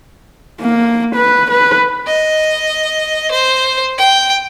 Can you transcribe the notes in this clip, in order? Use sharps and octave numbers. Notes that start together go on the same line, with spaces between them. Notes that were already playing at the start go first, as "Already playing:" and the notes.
A#3
B4
B4
D#5
C5
G5